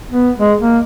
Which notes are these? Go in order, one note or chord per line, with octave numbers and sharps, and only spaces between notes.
B3
G#3
A#3